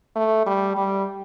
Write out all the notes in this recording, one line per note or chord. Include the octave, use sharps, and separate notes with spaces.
A3
G3
G3